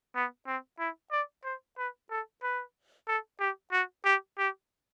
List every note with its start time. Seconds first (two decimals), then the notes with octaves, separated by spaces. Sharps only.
0.15 B3
0.47 C4
0.79 E4
1.12 D5
1.45 C5
1.78 B4
2.11 A4
2.43 B4
3.08 A4
3.40 G4
3.72 F#4
4.05 G4
4.38 G4